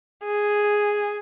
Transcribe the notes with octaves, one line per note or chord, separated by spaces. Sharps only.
G#4